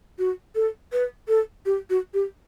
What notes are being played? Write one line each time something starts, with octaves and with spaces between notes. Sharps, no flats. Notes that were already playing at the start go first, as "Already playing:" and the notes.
F#4
A4
B4
A4
G4
F#4
G4